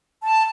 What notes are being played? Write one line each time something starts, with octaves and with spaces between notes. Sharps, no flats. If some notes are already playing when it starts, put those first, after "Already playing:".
A5